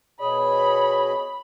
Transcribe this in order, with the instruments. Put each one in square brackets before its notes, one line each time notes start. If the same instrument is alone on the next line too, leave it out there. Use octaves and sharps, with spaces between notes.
[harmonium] B2 G#4 D#5 [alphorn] C#5 [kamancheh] B5